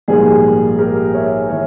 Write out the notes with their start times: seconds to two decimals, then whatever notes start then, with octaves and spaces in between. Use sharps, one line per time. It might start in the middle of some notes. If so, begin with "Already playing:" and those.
0.08 A#1 G#2 G3 A#3 G#4
0.78 G4 A#4
1.13 C#5 E5
1.49 E3 C#5 E5